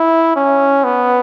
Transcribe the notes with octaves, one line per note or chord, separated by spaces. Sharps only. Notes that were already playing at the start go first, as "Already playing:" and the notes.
Already playing: E4
C#4
B3